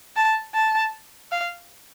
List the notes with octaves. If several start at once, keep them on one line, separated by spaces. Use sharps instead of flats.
A5
A5
F5